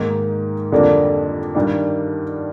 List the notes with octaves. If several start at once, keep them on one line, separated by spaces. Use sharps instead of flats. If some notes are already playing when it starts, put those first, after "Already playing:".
Already playing: G#2 D#3 A#3
F2 D3 G3 A#3 D4
G2 D#3 G3 D4